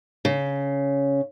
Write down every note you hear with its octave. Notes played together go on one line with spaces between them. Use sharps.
C#3